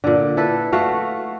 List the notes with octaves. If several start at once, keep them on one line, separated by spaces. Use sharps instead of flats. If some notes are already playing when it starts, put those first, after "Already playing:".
A#2 D3
E4 A4 B4
A3 F#4 F5